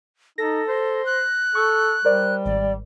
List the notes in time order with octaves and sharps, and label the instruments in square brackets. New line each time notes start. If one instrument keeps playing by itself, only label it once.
[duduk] D#4 [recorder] A4 [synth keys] A#6
[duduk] C5
[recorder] F#6
[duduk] A4 [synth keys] C#6
[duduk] G3 [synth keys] A#4 C5 D5
[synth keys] G#1 [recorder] D5